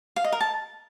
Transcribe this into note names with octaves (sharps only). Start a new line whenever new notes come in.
F5
D#5
A#4
A5